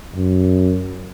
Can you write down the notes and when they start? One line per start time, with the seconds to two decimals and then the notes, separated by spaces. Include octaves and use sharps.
0.15 F#2